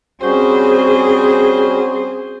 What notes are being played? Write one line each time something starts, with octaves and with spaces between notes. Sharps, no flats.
G3 C4 C#4 F#4 G#4 C5